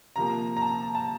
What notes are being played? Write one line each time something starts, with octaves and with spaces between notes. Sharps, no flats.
C3 F3 A#3 A#5
A#5
A5
A5